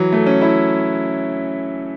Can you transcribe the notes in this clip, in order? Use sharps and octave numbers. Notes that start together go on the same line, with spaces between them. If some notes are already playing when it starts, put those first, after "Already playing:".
Already playing: E3 F#3
A3
C#4
E4